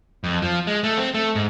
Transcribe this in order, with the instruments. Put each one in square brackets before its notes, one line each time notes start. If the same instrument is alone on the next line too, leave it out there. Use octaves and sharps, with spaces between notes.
[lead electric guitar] F2
F3
G#3
A3
C4
A3
G#2